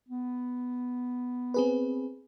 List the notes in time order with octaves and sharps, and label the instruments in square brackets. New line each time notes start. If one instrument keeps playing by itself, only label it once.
[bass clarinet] B3
[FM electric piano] C4 G#4 B4